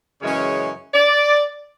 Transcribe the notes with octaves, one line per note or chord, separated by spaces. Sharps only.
F#2 C#3 E3 G#3 C#4 C#5
D5